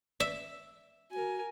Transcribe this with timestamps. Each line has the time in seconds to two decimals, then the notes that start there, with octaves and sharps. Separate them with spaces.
0.20 D5 E5
1.11 F#4 A#4 G#5